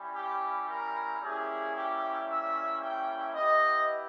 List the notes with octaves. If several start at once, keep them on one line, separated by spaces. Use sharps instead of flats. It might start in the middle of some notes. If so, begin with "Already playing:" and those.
Already playing: G3 C#4 E4
G4
A#4
G3 A#3 C#4 E4 G4 G#4
G4
E5
G5
B3 E4 G4 D#5